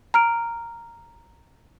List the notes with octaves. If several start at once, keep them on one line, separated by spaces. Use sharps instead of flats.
A#5 F6 D7